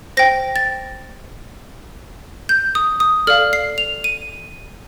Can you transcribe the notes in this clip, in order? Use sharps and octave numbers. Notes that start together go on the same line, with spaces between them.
C5 G5 A#6
A6
G6
D#6
D#6
A4 D5 F5 F6
C7
F7
D#7